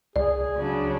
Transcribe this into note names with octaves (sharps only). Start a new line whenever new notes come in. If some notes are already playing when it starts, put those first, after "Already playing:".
C#2 G#4 D5
C#3 F#3 D4